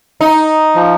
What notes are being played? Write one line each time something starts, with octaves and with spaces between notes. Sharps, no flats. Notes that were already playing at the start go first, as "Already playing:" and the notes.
D#4
F3